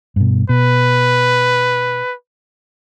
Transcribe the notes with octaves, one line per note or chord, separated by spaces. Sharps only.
G2 B2
B2 B4